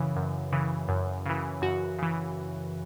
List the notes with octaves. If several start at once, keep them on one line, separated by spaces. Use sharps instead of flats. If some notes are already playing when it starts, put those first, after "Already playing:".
Already playing: F#2 C#3 E3
F#2
C#3 E3
F#2
C#3 E3
F#2 F#4
C#3 E3